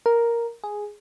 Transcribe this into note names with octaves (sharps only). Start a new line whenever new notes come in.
A#4
G#4